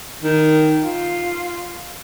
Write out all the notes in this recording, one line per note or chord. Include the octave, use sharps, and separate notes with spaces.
D#3
F4